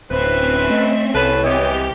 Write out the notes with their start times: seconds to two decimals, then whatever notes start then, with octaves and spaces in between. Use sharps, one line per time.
0.11 D1 C4 C#4 B4 C5 E5
0.70 A3 D#5
1.15 C2 A4 B4 C#5
1.44 C3 E3 G#3 B3 G4